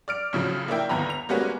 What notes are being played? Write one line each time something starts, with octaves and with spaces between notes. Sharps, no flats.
D5 F6 D7
A2 C#3 F3 F#3
A#3 D4 E4 G5
G1 D#2 B3 A#5 B5
F7
G3 G#3 A#3 B3 C#4 F#4